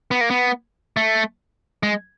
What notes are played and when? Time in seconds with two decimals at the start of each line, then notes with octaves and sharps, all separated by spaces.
0.11 B3
0.21 A#3
0.30 B3
0.97 A3
1.83 G#3